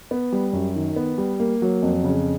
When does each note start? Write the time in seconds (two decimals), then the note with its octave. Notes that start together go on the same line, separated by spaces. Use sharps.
0.11 B3
0.32 G3
0.53 F#2
0.75 D#3
0.96 B3
1.18 G3
1.40 A#3
1.62 F#3
1.82 F2
2.04 C#3